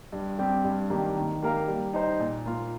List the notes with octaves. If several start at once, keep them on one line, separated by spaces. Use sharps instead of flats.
G2
G3 C4 G4
G2
D#3 G3 A#3 G4
D#3
A#3 G4 A#4 F5
G3
D#4 C5
A#2
A#3 F4